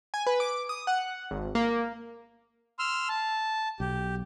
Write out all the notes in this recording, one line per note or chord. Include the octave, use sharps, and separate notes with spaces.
G#5
B4
D6
D#6
F#5
G#1
A#3
C6 E6 F6
A5
B1 G4